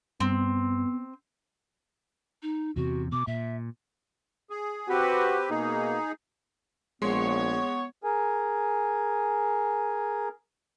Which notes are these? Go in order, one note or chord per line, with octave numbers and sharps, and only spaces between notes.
G2 B3 C4
D#4
E2 C3 F#4
B2 D6
A#2 E5
G#4
C4 F#4 G4 B4
B2 A#3 D#4 G#4
A#1 G#3 B3 C#5 C6
G#4 A#4 G#5